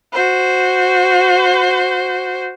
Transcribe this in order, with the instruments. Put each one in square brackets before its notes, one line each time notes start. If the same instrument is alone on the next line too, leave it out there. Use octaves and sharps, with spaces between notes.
[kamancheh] F#4 C5